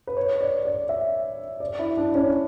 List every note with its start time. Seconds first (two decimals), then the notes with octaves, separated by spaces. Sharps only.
0.07 B4
0.17 C#5
0.41 D5
0.65 D5
0.89 E5
1.60 D5
1.79 E4
1.97 D4
2.15 C#4